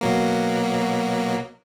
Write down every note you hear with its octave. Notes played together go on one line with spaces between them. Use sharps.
B2 F#3 A#3